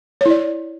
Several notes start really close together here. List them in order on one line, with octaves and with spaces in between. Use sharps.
C#5 E4 D5